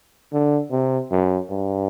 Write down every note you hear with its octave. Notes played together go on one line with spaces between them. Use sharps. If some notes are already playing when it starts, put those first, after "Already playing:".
D3
C3
F#2
G2